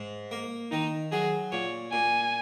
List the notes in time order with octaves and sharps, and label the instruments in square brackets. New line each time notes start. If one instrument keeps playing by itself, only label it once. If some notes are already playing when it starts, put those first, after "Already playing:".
Already playing: [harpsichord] G#2
A#3
[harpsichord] D#3 [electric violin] D#4
[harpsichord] F#3 [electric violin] G#4
[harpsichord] A#2 [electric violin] C#5
[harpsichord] A#2 [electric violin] G#5